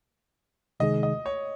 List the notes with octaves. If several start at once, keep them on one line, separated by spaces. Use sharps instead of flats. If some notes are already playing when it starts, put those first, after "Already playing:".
C3 D#3 G#3 D#4 G#4 D#5
D#5
C#5